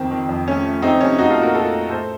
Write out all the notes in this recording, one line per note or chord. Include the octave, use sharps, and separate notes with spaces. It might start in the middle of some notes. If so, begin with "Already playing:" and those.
Already playing: F2 D#3 C4
D#3
F2
A3 C#4
A3
A3 C4 D#4
C3 C#4
A3 D#4 F#4
F4 A4
A#2
F#4 A#4
A3 F4 A4
A3
A2 A4 C5